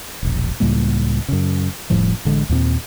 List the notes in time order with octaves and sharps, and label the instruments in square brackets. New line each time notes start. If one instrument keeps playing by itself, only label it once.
[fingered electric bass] E1 A#1
C#2 A2 G3 A#3
F#2 C#3
F1 A2 F3 G3
A1 D3 G#3
D#2 A#2 B3 C4